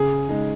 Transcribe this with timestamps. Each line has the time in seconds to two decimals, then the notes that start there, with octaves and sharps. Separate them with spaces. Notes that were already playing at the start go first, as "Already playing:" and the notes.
Already playing: C#3 G#4
0.28 G#3 D#4